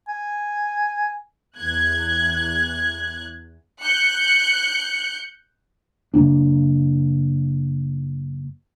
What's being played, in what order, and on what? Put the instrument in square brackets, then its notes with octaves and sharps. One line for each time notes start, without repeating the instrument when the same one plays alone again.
[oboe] G#5
[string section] E2 F#6 G#6
[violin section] F#6 G6 C#7
[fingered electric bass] F#2 C#3 A#3 D4